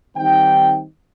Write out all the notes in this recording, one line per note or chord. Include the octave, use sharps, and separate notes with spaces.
D#3 G3 C4 D#4 G5